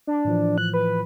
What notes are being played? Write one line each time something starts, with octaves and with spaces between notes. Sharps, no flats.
D4
A2 E3 F3
F#6
B4